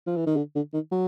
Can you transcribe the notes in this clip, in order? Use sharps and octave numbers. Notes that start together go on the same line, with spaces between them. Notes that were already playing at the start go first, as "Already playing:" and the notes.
F3
E3
D#3
D3
D3
D#3
F#3